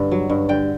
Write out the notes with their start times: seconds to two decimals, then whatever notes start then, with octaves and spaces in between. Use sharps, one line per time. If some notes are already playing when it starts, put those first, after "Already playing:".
Already playing: G2 D3
0.12 F#3
0.30 G2
0.49 D3 G5